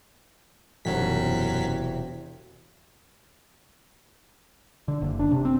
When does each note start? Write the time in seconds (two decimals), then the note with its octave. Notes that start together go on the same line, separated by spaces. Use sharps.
0.85 E1 F#2 C3 F#3 B6
4.88 D3
5.01 F#1
5.19 D4
5.32 C3
5.45 C4